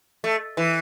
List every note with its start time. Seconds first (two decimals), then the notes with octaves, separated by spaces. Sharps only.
0.24 A3
0.57 E3